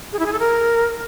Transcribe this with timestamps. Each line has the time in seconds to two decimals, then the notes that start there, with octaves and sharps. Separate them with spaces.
0.12 G#4
0.19 E4
0.26 G#4
0.33 A4
0.39 A#4